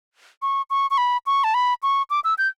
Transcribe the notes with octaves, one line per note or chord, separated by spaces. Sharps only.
C#6
C#6
C#6
B5
C#6
A5
B5
C#6
D6
E6
G6